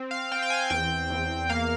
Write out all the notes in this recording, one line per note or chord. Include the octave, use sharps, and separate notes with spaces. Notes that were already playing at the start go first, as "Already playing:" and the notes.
Already playing: C4
F5
C4 G5
G5
G#5
E2 G5
E2
A#3 F5